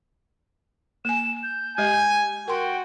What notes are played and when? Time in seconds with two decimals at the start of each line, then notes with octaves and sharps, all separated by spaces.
1.05 A#3 G#5 E7
1.43 G6
1.78 G#3 G4 D#5 G#5
2.48 F#4 A#4 G5 C6